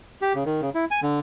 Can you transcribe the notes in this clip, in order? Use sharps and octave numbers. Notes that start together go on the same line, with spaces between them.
G4
C#3
D#3
C#3
E4
G#5
D3